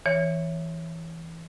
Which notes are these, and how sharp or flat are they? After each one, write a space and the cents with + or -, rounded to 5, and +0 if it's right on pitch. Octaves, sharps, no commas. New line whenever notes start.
E3 +0 C#5 +0